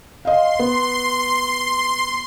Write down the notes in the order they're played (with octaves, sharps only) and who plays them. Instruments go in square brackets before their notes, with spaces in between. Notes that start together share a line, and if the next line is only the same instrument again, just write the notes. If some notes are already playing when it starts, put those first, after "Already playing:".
[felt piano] D#5 F5 [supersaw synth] C6
[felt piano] B3